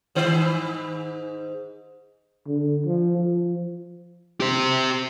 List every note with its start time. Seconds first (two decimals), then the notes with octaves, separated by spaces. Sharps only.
0.15 G#2 D#3 C5
2.47 D3
2.87 F3
3.18 F3
4.40 G4 C5